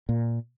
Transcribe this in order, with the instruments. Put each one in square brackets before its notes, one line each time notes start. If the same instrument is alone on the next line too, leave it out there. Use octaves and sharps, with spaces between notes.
[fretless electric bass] A#2